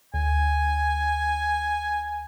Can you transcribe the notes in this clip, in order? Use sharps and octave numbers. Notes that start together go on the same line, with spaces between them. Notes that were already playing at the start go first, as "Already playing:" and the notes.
D2 G#5